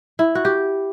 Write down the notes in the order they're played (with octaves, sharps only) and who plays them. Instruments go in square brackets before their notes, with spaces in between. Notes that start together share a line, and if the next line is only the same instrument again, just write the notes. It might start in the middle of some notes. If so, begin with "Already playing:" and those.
[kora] E4
F#4
G4